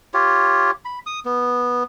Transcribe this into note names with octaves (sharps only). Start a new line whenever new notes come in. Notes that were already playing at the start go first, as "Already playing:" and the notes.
F4 G4 C#5
B5
D#6
B3